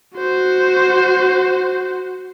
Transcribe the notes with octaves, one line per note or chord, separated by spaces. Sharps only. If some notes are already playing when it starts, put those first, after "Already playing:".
F#4 C5